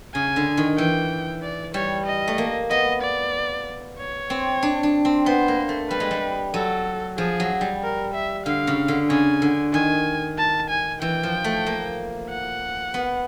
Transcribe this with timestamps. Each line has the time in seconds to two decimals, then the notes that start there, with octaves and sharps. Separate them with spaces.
0.15 C#3 G#5
0.36 D3
0.57 D#3
0.78 E3 G5
1.43 D5
1.74 G3 C#5
2.06 D#5
2.28 A3
2.38 A#3
2.71 B3 D#5
3.02 D5
3.99 C#5
4.30 C4
4.63 D4
4.83 D4
5.05 C4
5.26 B3 C5
5.48 A#3
5.69 A3
5.90 G3 B4
6.00 G#3
6.11 G3
6.54 F#3 A4
7.18 F3 G#4
7.40 F#3
7.61 G3
7.83 A#4
8.14 E5
8.46 D3 F5
8.67 C#3
8.88 D3
9.10 C#3 G#5
9.42 D3
9.73 D#3 G#5
10.38 A5
10.70 G#5
11.02 E3 G5
11.23 F3
11.44 A3
11.66 A#3
12.30 F#5
12.94 B3